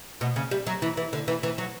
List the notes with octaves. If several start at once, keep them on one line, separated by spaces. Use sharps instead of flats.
B2
C#3
G3
F#3
E3
E3
D3
E3
E3
F#3